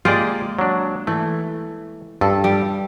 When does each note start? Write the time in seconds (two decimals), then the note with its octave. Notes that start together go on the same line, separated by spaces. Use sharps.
0.05 G#3 A#3 F4 G4 G#4 D5
0.59 F#3 D4
1.07 E3 A3
2.21 G2 A4
2.44 G3